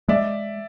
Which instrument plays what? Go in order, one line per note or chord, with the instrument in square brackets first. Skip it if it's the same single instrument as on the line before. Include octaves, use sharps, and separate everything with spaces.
[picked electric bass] G#3 [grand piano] D5 E5